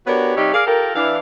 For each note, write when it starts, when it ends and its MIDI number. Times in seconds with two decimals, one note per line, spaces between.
0.07 0.35 59
0.07 0.35 62
0.07 0.35 66
0.07 0.35 67
0.07 0.35 70
0.07 0.35 73
0.37 0.50 48
0.37 0.50 55
0.37 0.50 63
0.37 0.50 67
0.37 0.50 73
0.54 0.63 68
0.54 0.63 70
0.54 0.63 74
0.54 0.63 77
0.67 0.92 65
0.67 0.92 67
0.67 0.92 69
0.67 0.92 70
0.96 1.18 52
0.96 1.18 62
0.96 1.18 77